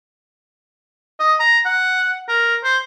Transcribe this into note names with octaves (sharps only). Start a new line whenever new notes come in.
D#5
A#5
F#5
A#4
C5